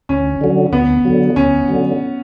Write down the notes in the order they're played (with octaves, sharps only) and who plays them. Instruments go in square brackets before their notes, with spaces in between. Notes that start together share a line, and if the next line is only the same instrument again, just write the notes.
[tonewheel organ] D2 [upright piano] C#4
[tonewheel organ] D3 F#3
[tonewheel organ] D2 [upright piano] B3
[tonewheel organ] D3 F#3
[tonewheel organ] D2 [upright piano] C#4
[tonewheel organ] D3 F#3